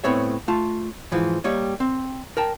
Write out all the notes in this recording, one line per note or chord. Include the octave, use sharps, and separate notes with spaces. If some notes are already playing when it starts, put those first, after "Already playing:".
A2 B3 C4 C#5 E5
A3 F4 A5
G#2 E3 F3
G3 A#3 C#5 D#5
C4
A#4 G5 A5